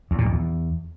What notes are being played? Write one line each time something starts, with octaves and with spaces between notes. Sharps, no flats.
E2
A#2
F2
E2